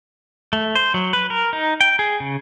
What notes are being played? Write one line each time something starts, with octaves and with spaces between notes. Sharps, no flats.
A3
C5
F#3
B4
A#4
D#4
G5
G#4
C#3